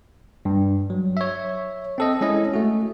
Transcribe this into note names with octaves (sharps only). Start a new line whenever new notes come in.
G2
F#3
C#5 E5
C4 A4 D#5
G#3 C#4 E4 D#5
A3 F#4